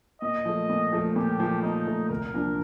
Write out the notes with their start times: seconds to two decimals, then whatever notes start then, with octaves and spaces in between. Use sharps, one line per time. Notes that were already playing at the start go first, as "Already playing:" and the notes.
0.21 A#2 D#5
0.46 F3 A3
0.70 A#2
0.93 F3 A3
1.16 A#2 G4
1.39 F3 A3
1.63 A#2 D#4
1.87 F3 A3
2.10 C2 A#4
2.34 A#2 F3 A#3 D4